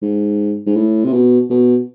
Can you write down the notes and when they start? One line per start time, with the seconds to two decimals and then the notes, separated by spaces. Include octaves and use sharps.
0.02 G#2
0.66 G#2
0.76 A2
1.04 C3
1.13 B2
1.50 B2